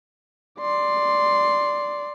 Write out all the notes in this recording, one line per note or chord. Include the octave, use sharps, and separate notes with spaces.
D5 C6